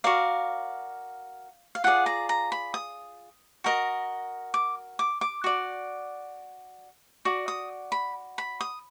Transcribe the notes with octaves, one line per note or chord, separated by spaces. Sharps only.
F#4 A#4 D5 F5
F5
F4 G#4 D5 F#5
A#5
A#5
B5
D#6
F#4 A#4 D#5
D6
D6
D6
F#4 D5
F#4 D5
D#6
B5
B5
D#6